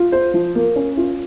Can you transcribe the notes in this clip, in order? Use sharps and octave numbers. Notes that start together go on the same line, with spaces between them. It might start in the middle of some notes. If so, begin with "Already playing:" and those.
Already playing: F4
C5
F3
A#3
C#4
F4